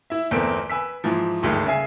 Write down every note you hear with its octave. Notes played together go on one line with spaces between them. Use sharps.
E4 E5
G1 E2 A3 A#3 C4 D7
B4 G#5 E6 B6
G#2 E3 F3
G#1 D2 G2 D#3 G#3
C#3 E5 G#5 C7